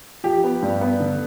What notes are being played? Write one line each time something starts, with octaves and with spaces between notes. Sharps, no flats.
F3 G4
B3
G2
B3
D3